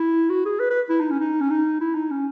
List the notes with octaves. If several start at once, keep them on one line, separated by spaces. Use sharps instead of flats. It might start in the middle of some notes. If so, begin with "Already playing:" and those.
Already playing: E4
F#4
G#4
B4
B4
E4
D#4
C#4
D#4
C#4
D#4
E4
D#4
C#4